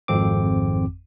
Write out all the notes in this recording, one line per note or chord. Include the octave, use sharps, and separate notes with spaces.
G#1 F2 C4 D6